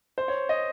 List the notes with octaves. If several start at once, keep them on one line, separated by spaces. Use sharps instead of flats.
C5
C#5
D#5